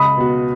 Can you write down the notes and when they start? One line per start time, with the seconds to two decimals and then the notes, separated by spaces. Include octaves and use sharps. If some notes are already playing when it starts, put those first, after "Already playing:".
Already playing: C#2 B5 D#6
0.17 B2 B3 F#4